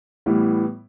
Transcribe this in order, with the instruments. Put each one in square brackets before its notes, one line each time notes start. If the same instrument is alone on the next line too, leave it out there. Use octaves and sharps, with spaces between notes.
[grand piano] A2 E3 G3 B3